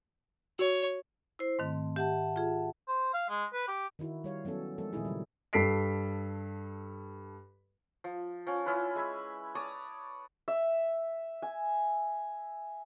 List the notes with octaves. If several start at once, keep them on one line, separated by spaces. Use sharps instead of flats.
F#4 C#5
E4 C5
G#2 D#3 A3 C4
G4 E5 F#5 A5
F4 G#4
C5
F5
G#3
B4
G4
D#3 D#4 E4 F#4
G3 C#5 F5
F#3 B3 C#4 A4
F3 G#3 C4 A4 A#4
A#2 D#3 C4 D#4 E4 G#4
C#3 F#3 G3
G2 A4 B6 C7 D7
F3
F3 C#4
C#4 E4 F4 B4
G#3 G#5 B5 E6
C#5 D5 A5 D#6
E5
G#5